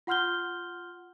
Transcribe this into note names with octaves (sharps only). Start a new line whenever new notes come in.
F4 F#5 C6 F6 G6 G7